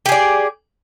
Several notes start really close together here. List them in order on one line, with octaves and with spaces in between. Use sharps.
G4 G#4 D5